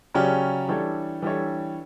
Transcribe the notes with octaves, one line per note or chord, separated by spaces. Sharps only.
C#3 F#3 C#4 G4 D5
E3 G3 D4 A4 C#5
E3 G3 D4 A4 C#5